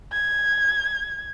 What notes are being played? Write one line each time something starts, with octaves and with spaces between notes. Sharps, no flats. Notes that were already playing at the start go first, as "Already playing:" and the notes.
G#6